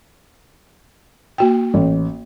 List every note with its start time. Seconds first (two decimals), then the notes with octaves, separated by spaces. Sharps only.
1.38 A#3 F#4 G5
1.74 A1